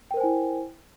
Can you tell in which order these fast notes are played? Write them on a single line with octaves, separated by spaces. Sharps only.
G5 A#4 C5 G#5 E4